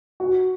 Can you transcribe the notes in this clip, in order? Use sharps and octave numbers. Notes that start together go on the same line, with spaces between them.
F#4